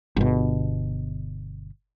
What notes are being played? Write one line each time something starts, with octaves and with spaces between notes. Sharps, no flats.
G1 B2